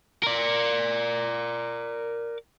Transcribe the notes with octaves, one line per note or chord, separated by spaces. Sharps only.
A#4 D5